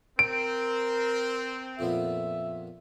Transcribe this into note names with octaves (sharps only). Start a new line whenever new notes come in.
C4 A#4 D7
F2 A#2 B3 E5